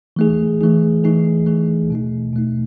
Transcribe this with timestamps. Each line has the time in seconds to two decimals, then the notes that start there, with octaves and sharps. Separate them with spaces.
0.16 E3 A3 D#4 G#4
0.61 E3 A3 D#4 G#4
1.04 E3 A3 D#4 G#4
1.46 E3 A3 D#4 G#4
1.90 B2 A3 D#4
2.33 B2 A3 D#4